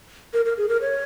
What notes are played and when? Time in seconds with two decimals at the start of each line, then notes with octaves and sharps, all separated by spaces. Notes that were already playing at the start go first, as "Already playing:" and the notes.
0.33 A#4
0.45 A#4
0.57 G#4
0.69 A#4
0.81 C#5